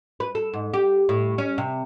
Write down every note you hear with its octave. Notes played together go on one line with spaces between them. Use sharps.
B4
A4
G#2
G4
A2
C#4
C3